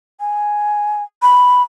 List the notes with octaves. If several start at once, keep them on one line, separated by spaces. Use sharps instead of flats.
G#5
B5